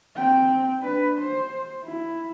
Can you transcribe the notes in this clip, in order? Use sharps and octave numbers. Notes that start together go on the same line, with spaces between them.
C4 G5
D4 B4
C5
E4